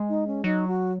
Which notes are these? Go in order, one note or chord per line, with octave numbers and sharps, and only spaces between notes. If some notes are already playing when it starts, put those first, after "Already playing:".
Already playing: G#3
D#4
C#4
F#3 D#4
F#4